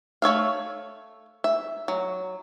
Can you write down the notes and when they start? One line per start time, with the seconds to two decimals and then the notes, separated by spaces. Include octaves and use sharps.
0.22 A3 C#5 E5 F5
1.44 E5
1.88 F#3